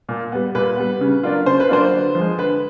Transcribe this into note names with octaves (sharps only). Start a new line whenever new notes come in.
A#2
G3 B3
A#2 B4
G3 B3
C#3
F#3 A#3 D4 F4
C#3 C5
B4
F#3 A#3 D4 F4 C5
D3
F3 G#3
D3 B4